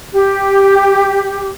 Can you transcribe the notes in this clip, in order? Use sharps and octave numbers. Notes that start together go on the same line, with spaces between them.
G4